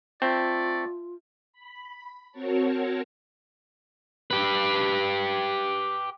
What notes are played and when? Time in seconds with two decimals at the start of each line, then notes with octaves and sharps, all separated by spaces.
0.22 A3 C4 F4 D5
1.53 B5
2.32 C4 F#4 A#4 C#5 A5
4.31 G4 B4